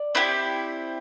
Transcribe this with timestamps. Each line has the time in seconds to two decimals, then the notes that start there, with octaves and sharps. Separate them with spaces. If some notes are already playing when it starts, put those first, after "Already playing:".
Already playing: D5
0.15 C4 E4 G4